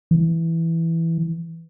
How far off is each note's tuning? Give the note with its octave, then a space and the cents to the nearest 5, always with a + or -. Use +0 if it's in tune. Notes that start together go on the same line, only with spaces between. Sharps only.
E3 +0